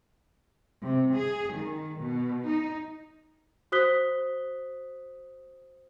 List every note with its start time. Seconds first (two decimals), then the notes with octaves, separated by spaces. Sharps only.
0.83 C3
1.17 G#4
1.56 D#3
2.02 B2
2.47 D#4
3.72 F#4 C5 D#6 F#6 B6 G7